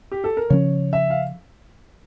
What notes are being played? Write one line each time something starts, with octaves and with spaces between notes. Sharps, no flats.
G4
A4
A#4
C#3 F3 C#4 C#5
E5
F5